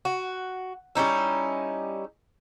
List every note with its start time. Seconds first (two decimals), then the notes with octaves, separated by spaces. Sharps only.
0.05 F#4
0.95 G3 C#4 D#4 E4